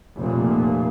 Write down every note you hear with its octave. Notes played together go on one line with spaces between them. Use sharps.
F1 A#2